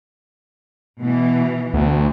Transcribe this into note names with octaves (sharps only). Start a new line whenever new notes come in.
B2 E3
D2